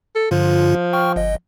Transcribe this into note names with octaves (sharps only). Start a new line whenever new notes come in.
A4
G2 D3 F3 F4
G5 C#6 F6
G1 D#5